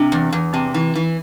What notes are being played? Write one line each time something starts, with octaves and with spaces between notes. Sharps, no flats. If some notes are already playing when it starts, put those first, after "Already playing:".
Already playing: C3 D4
E2
E2
C3 C4
E3
E3